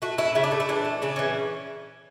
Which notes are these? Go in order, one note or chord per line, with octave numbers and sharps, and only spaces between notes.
A3 F#4
A3 E4
C#3 E4
D4
A3 A4
E4
E3 D4
A3
C#3 D4
E3 C#4